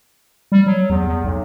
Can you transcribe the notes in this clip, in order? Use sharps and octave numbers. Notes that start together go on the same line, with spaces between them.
G3
F#3
E2
E2
B1